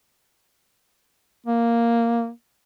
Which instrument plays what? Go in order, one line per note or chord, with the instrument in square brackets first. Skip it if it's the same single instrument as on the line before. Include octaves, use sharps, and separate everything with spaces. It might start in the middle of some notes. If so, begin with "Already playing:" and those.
[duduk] A#3